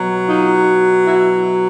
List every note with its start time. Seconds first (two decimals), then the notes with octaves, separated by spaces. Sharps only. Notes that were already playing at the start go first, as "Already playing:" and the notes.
Already playing: B2 F#3
0.27 D#4 F4
1.04 E4 F#4